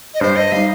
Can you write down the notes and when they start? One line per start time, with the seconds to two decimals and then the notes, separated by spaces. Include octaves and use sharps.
0.14 D#5
0.20 G2 C5
0.36 D#5
0.52 G3 D#4 F5